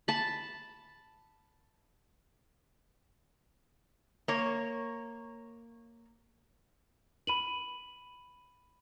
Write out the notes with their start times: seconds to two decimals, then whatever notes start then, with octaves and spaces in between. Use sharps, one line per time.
0.08 A5 B5
4.28 A#3 C#5
7.27 B5 D#7 F#7